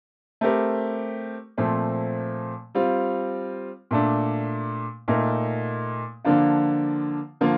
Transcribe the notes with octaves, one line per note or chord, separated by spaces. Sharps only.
A3 C4 G4 A#4
A#2 F3 A3 C4
G3 C4 F4
A#2 A3 D4
A#2 A3 D#4 A#4
D3 F3 A#3 D4 F4
D3 F3 A#3 F4